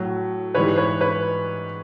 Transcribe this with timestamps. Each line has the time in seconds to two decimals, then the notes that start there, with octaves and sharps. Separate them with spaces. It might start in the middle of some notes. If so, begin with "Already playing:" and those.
Already playing: A2 F#3
0.55 G#2 E3 G3 B4 C#5
0.78 B4 C#5
1.01 B4 C#5